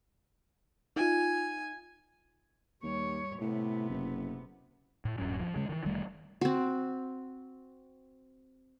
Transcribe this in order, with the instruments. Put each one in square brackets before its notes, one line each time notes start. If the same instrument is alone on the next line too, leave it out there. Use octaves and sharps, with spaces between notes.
[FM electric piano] D#4 F4 [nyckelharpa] G#5
[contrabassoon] D#2 [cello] G3 C#5
[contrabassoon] A2 [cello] C3 B3
[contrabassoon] F#1
[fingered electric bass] A2
D#1 G2 F#3 C#4
F3
C#3 G#3
D#3 E3
F1 D#3 G3 A3
[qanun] C4 F#4